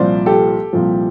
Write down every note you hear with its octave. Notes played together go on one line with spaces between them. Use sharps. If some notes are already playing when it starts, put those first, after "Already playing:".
Already playing: C2 A#2 F3 C5 D5
G4 A4
C2 A#2 F3